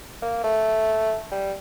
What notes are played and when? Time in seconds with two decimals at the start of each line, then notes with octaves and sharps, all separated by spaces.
0.22 A#3
0.44 A3
1.32 G3